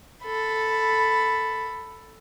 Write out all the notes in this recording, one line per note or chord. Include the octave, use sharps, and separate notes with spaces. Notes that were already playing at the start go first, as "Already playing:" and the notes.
A4 B5